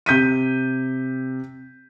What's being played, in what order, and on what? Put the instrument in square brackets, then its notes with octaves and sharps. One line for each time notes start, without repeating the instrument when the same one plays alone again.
[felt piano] C3 G6 B6 D#7